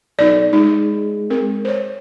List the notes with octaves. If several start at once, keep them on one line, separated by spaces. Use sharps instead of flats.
B1 D#4 D5
G#3 D#4
C4 A#4
C5 C#5